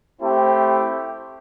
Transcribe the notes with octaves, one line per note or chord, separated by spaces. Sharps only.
A3 C4 E4 G4